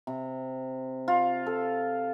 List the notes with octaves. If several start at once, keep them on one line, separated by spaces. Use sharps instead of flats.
C3
F4
A4